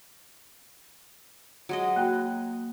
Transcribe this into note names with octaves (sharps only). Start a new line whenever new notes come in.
F#3 G#3 D#5
A#3 F#4 G5 F#6